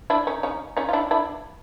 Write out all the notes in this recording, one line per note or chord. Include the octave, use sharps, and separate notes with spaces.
D4 E4
C#4 D#4
C#4 D#4
C#4 D#4
F4
D4 E4
D4 E4